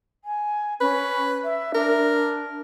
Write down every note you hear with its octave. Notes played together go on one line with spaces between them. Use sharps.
G#5
C#4 B4
E5
D4 A#4